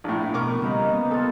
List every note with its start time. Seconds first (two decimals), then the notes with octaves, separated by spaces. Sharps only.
0.04 A#1 A2
0.34 B2 A#4 B4 C#6 D6
0.62 C#3 G3 A#3 D#4 B4
0.93 B3
1.11 G3 F4 A4